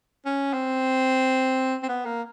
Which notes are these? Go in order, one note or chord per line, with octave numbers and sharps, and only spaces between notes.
C#4
C4
C4
B3
A#3